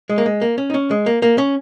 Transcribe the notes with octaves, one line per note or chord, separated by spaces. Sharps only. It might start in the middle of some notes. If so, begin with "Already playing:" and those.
G#3
A#3
G#3
A#3
C#4
D#4
C#4
G#3
A#3
A#3
C#4